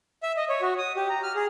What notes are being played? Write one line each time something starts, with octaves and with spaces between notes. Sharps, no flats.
E5
D#5
C#5
F#4
D#6
G4
A#5
F6
G#4